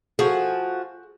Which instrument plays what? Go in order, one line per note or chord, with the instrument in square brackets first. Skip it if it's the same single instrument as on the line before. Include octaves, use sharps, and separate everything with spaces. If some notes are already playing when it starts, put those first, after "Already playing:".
[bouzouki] F3 F#4 [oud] G#4